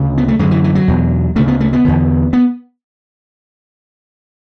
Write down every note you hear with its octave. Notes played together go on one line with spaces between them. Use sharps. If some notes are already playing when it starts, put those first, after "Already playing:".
Already playing: D2 C#3
B3
A3
F#2 D3 G#3
E3
E3
F#3
E2 B2
D2 C#3 A3
B3
A3
B3
E2 D3
B3